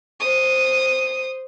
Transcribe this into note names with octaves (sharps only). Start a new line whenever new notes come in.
C5 D#6